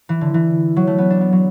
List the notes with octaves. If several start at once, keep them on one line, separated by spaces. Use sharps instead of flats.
E3
D3
E3
F#3
A3
B3
D4
B3
F#3